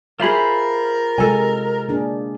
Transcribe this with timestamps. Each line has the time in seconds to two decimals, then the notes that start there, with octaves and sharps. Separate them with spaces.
0.20 F4 G#4 A#4 C5 E5 B5
1.18 C3 G#3 A4 D#5 G#5
1.89 A#3 D4 G#4